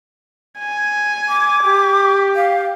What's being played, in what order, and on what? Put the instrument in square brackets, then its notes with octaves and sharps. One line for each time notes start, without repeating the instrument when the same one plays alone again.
[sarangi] G#5
[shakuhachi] D6
[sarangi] G4
[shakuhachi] F5